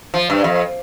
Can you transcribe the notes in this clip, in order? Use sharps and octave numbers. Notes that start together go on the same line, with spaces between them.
F3
G2
F2